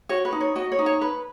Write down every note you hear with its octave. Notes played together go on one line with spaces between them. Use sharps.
F#4 C#5
B4
D#4
C#5
F#4 D#5
C#5
D#4
C#5
B4